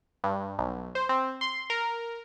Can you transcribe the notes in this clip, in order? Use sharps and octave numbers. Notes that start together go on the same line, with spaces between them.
G2
B1
C5
C4
C6
A#4